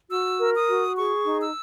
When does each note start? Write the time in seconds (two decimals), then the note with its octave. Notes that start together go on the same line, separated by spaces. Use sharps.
0.10 F#4 E6
0.39 A#4
0.54 D#6
0.68 F#4
0.97 G#4 C#6
1.26 D#4
1.40 E6